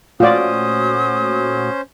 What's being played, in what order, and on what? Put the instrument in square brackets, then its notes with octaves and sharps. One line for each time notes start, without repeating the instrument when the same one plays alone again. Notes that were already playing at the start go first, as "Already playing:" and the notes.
[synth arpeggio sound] A#2 A3 F#4 [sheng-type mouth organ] C#4 C5 [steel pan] F4 D5 [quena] D#6